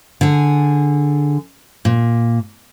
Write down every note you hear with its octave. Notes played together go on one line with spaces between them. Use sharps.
D3 G#4
A#2